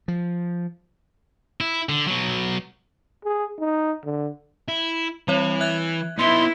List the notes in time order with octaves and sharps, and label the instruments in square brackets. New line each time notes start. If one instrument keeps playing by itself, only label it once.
[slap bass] F3
[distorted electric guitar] E4
D3
B2 F#3
[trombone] G#4
D#4
D3
[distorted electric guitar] E4
[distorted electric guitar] E3 [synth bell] G3 C4 C#5
[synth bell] E5 F#6 G#6
[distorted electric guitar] B3 D#4 [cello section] E4 [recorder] C6